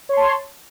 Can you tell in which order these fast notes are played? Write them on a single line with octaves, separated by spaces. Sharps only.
C#5 C6 A5